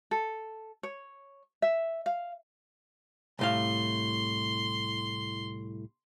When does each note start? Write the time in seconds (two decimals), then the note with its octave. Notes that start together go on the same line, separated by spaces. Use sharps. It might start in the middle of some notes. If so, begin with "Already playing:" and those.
0.11 A4
0.83 C#5
1.62 E5
2.06 F5
3.39 C2 A2 F5 C6